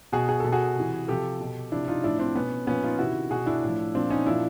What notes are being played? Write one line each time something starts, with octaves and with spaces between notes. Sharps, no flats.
B2 F#4 G#4
G#4
B2 A4
F#4 G#4
C3 E3
C3 F3 G4 A4
B2
C3 F3 D4 E4
D#4 F4
A2 F3 D4 E4
C4 D4
B2 B3 C#4
A#2 F3 B3 C#4
D#4 F4
C3 D#3 E4 F#4
B2 F#4 G#4
D4 E4
A2 F3
A#2 F3 C4 D4
C#4 D#4
A#2 F3 D4 E4